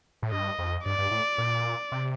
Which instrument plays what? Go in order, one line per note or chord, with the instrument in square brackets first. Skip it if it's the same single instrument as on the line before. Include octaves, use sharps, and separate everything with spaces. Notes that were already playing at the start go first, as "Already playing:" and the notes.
[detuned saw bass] A2
[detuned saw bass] G2 [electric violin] D#5
[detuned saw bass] F2
[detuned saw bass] G2 [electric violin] D5
[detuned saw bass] G2
A2
A#2
C3